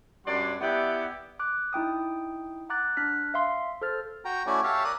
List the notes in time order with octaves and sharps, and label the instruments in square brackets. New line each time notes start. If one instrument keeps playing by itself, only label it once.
[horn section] F#2 G3 D4 D5 F#5 C6
B3 E4 G4 D5 F#5
[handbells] D6 F#6
D#4 E4 G5 D#6
F#5 A#5 D6 F#6 A6
D4 F6 F#6 B6
E5 F5 C6
A4 C5 F6 A6
[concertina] F#4 G5 A#5
A3 C#4 E4 F#4 D5 G#5
G4 C#5 E5 F5 A5
A#4 D5 D#6 F#6